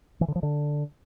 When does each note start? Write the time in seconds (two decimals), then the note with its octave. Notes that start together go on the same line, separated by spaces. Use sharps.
0.21 E3
0.28 D3
0.36 F3
0.43 D3